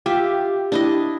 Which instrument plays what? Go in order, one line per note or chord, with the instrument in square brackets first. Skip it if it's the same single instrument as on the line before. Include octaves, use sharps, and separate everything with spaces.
[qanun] F4 E5 [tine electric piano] G4
[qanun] D4 E4 D#5